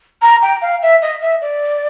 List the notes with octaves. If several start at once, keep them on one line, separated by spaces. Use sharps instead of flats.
A#5
G5
F5
E5
D#5
E5
D5